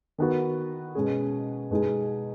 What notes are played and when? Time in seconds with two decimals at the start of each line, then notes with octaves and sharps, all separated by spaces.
0.18 D#3 B3 F#4
0.95 B2 G#3 C#4 G#4
1.71 B2 G#3 D#4 G#4